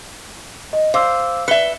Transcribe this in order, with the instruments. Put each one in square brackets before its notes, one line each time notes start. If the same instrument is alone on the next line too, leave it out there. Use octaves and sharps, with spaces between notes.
[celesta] D#5
[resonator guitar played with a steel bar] C5 [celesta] F5 D6 E6
[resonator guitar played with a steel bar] B4 E5 [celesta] C#7 G7